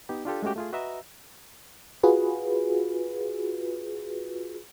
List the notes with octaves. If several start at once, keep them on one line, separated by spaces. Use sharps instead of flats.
B3 D#4 G4
D4 F4 G4 A4
G#3 A3 C#4 F#4 G4
A3 F4 G#4
F#4 B4 D#5 E5 A#5 E6
F4 F#4 G#4 B4